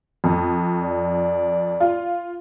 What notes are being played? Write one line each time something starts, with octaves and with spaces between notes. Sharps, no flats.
F2
D5
F4